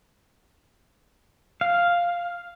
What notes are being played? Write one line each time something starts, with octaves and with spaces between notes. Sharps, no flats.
F5